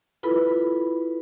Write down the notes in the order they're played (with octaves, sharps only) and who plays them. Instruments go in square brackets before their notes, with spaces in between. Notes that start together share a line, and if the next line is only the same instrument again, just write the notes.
[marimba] E4 F4 A4 B4 B5